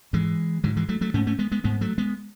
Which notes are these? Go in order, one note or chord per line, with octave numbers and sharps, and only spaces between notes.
G#2 E3 G#3
G#2 D3 F#3
E3 G#3
F#3 A3
F#3 A3
G#2 A3 C#4
A3 C#4
G#3 B3
G#3 B3
G#2 G#3 B3
F#3 A3
G#3 B3